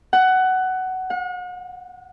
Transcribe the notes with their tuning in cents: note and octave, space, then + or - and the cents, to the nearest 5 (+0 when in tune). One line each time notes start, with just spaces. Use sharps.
F#5 +15
F#5 -40